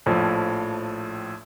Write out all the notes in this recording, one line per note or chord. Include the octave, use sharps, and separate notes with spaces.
A#1 A2 F3